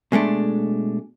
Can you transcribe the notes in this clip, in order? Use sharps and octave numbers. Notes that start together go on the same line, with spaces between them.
B2 G#3 A3 D4